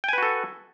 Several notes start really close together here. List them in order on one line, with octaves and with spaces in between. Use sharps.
G5 G#5 B4 F#4 A4